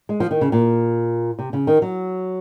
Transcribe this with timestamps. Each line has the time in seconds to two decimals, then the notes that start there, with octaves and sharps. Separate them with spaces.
0.09 G#3
0.20 F3
0.31 D#3
0.41 C#3
0.52 A#2
1.39 C3
1.53 C#3
1.67 D#3
1.82 F#3